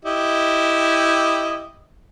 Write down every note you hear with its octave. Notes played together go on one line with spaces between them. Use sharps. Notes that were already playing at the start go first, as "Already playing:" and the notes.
E4 G4 D#5